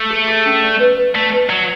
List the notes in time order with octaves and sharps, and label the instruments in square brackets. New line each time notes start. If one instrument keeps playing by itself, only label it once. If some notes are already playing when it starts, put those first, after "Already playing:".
Already playing: [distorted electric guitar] A3
[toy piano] G#4
G#4
C#4
D5
B4
B4
[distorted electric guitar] A3 [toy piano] D5
[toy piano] B4
[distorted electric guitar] F#3 [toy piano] D5